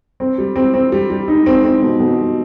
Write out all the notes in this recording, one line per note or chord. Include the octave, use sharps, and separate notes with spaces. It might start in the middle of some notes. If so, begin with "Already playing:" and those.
C4
G3
C4
C4
G3
G3
D#4
C4
C4
B2
B2
G3